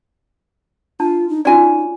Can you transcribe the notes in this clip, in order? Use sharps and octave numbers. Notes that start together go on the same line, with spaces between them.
D4 F4 A5
D#4
C#4 D#4 F4 F#4 D5 G#5